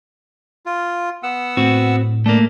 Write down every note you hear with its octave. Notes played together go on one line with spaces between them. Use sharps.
F4
B3 F#5 E6
A2 C4 F#4
A3 A#3 D4